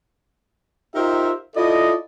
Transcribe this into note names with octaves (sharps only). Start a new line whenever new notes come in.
D#4 F4 G4 A#4 C5 E5
E4 F4 A4 D5 D#5